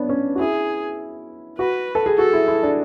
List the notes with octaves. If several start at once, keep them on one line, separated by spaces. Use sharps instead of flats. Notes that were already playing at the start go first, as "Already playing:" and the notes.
Already playing: B3 D4 C#5
C#4
F#4
E4 G#4
F#4 B4
A4
G#4
F#4 A4
E4
E4
D4